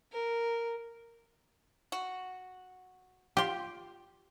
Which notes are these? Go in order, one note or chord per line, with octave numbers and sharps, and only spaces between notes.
A#4
F#4
F4 G4 C6